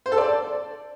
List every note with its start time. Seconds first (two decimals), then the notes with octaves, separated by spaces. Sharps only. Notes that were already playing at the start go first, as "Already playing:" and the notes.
0.06 C5
0.12 A4
0.18 D5